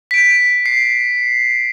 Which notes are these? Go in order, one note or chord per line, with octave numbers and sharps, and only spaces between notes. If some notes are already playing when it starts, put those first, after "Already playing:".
B6 D7
C7